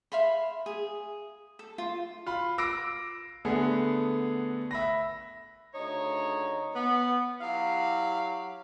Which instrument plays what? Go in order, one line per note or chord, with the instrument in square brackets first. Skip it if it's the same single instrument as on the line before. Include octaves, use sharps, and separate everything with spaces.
[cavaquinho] E5 F5 B5 C6
G#4
A4
F4
[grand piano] F4 B5
D6 E6 A#6 C7 D7
D3 A3 B3 G#4
E5 B5 A#6
[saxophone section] D2 C#3 D#4 C#5
B3
F#3 E4 G4 F5